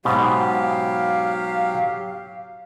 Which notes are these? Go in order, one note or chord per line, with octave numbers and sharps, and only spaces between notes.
G#2 B2 F#3 G4 F5